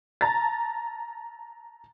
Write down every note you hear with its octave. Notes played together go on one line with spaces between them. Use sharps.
A5 A#5 A6